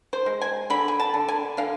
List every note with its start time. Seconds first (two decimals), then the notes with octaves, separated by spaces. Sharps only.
0.13 C5
0.26 G#3
0.41 G#5
0.70 D3 B5
0.88 G#5
1.00 A5
1.14 D3
1.28 G#5
1.57 D3 F5